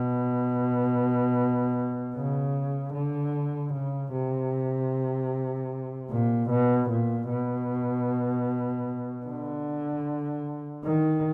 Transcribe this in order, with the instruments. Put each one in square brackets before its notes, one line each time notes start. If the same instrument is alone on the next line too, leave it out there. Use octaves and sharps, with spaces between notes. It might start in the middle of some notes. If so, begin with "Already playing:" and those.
Already playing: [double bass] B2
C#3
D3
C#3
C3
A#2
B2
A#2
B2
D3
D#3